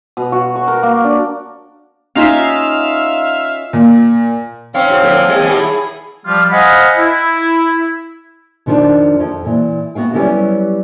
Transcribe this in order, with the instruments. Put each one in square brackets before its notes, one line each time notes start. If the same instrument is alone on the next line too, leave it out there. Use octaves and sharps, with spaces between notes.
[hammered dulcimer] B2
F#4
C#6
A#4
A#3
D4
[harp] C#4 D#4 F4 [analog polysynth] E5 F5
[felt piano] A#2
[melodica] C4 F5 [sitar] C#4 C#5
[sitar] G#2 F#4
A2 D3 F3
A#2 G3 D#5
[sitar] D#2 B2 G3 [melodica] G#5
[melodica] E4 [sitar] G#4
[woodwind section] F3 G3 F4
C5 D#5 F5 F#5 G#5 B5
E4
[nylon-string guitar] F2 D#3 F3 G3 D4 D#4
F2
A#2 E3
B3 F#4 F5 G5
F#3 G3 B3 C#4 E4 G4